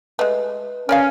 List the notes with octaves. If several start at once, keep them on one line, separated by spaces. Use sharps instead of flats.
G#3 A3 B4 D#5
C#4 A#4 D5 F5